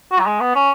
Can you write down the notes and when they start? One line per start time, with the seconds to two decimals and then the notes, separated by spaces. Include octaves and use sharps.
0.12 F#4
0.20 F#3
0.27 G#3
0.40 B3
0.55 C#4